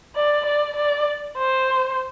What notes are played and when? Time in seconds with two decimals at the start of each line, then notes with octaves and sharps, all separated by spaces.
0.16 D5
0.46 D5
0.76 D5
1.38 C5